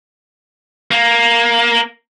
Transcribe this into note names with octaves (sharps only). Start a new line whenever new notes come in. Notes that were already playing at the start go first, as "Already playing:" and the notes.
A#3